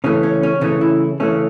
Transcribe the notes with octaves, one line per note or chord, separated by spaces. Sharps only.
C#3 E3 A3 C#4
C#4
C#4
C#3 E3 A3 C#4
E4
C#3 E3 A3 C#4